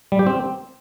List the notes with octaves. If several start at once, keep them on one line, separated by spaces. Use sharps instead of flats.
G3
G4
C4